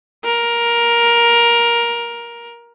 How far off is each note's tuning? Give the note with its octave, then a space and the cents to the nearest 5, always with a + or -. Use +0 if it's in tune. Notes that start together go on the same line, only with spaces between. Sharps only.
A#4 +15